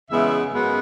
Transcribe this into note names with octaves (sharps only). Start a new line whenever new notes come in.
E2 C#3 G#3 B3 E5
F#2 C#3 G#3 B3